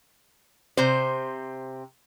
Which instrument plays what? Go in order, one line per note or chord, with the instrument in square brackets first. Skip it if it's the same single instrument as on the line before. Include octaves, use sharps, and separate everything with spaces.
[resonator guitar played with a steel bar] C3 C5